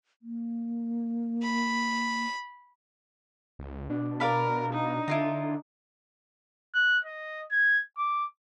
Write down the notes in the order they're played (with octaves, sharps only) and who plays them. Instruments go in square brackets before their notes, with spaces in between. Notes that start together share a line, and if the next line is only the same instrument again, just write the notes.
[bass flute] A#3
[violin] B5
[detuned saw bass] C#2
[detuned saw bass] B2 [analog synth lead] D4
[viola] A#4 [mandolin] D5 F5 B5
[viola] D#4
[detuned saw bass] D3 [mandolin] E4 F4 A#5
[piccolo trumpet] F#6
D#5
G#6
D6